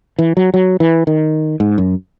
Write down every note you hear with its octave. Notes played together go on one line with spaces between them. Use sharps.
E3
F#3
F#3
E3
D#3
G#2
F#2